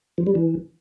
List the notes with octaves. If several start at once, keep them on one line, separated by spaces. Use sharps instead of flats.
F3
G3
E3